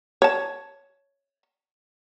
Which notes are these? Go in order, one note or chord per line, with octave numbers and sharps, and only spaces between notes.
C#5 A5